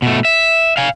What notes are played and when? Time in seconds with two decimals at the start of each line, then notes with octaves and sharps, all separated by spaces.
0.02 B2 A3
0.25 E5
0.77 F5 G#5